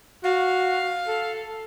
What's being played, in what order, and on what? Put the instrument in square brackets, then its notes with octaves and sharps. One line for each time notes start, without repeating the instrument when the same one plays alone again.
[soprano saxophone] F#4 [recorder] F5
[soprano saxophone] A4